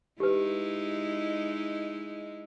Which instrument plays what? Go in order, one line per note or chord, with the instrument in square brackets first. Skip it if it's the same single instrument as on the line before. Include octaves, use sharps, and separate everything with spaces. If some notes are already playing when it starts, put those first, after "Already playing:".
[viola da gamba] G#3 D#4 E4 [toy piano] G4 B4